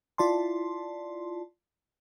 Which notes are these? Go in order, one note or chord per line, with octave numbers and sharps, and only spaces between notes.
E4 F4 D5 A5 C6